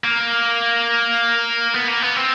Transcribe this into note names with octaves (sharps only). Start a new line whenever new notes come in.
A#3
B3
A#3
B3
C4